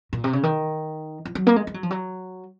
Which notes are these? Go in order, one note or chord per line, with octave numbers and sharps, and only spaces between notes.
A#2
C3
C#3
D#3
F3
F#3
A#3
G#3
G#3
F#3
F3
F#3